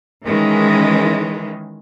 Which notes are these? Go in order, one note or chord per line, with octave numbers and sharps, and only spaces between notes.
D#3 E3 G#3 C#4